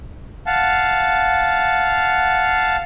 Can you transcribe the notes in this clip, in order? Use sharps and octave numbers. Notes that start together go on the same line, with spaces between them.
F5 F#5 A5